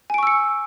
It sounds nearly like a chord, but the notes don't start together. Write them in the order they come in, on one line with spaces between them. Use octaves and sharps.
G#5 D7 C#6 E6 C#7